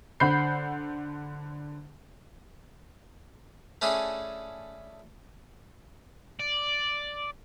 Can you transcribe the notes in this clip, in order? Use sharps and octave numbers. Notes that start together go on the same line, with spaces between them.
D3 C5 F#5 B5 G6 C7
A3 C#4 D4 E4 G#4
D5